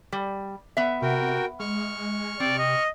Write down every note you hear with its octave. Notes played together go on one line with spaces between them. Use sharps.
G3
B3 E5
C3 F#4 A#4 G5
G#3 C#6 F6
C3 C4 D5
D#5